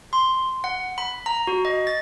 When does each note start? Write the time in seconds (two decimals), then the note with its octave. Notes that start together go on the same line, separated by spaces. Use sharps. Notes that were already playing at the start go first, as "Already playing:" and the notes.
0.13 C6
0.64 F#5
0.98 B5
1.26 A#5
1.47 F#4
1.65 D#5
1.87 A6